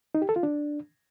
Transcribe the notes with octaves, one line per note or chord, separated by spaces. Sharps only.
D#4
G4
A4
F4
D4